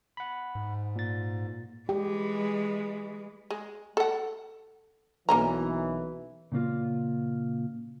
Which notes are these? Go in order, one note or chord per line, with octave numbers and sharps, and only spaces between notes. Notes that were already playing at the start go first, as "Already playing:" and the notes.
F#5 B5
G#2
A#2 A6
E3 G#3 G4
G#3
A4 F#5
B1 E3 A#3 C#4 A#5
A#2 C#3 A#3 F4